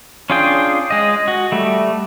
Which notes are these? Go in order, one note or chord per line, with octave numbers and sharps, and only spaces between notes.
C#4 D4 F4 G#4 G5
G#3 D#5
F#4
G3 A3